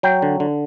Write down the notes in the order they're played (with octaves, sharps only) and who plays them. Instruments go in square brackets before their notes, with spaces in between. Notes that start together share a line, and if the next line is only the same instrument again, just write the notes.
[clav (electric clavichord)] F#3 G5
D3
D3